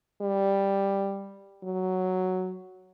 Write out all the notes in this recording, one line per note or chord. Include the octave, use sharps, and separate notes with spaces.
G3
F#3